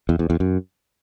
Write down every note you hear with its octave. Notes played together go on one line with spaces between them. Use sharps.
E2
E2
E2
F#2